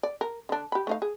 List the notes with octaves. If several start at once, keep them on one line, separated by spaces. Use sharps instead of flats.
D5
A#4
D3 D4
G4 B5
A3 D#4 F5
G#4